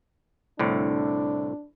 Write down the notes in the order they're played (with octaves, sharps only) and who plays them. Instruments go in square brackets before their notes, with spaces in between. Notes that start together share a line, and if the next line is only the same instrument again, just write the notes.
[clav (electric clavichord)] C2 A2 D3 [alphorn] D4